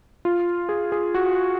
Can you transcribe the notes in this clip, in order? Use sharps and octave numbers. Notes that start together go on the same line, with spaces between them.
F4
G#4
G#4
F#4